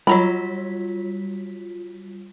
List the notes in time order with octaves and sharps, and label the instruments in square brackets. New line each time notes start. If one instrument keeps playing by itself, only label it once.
[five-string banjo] F#3 A#5 B5 [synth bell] G3 F4 B6